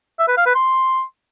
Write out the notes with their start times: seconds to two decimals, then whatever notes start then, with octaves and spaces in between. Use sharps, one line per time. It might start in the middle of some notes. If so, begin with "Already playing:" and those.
0.19 E5
0.28 B4
0.37 F5
0.46 B4
0.55 C6